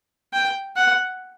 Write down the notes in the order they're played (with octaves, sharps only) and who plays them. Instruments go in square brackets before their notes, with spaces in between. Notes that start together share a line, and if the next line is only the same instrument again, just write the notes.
[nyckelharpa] G5
F#5